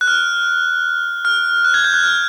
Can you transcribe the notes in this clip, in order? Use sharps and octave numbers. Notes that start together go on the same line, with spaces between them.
F#6
F6
F6
F#6
G#6
G6
F#6
F6